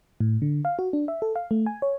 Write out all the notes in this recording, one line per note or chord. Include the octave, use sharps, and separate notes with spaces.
A2
D3
F5
F#4
D4
E5
A4
F5
A3
G#5
C#5